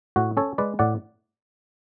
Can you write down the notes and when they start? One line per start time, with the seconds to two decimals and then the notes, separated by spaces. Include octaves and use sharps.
0.16 A2 F#4
0.37 C#4 A4 C#5
0.58 G#3 B4 D5
0.79 A2 D5 F#5